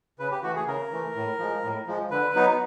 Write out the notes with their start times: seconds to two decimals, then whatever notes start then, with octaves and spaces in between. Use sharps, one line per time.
0.19 C#3 B4
0.31 G4
0.43 E3 A3 F#4
0.55 G#4
0.67 C#3 A#4
0.91 E3 A3
1.15 A2
1.39 F3 G#3
1.64 A2
1.87 F3 G#3
2.11 D3 B4
2.35 F#3 B3 D#4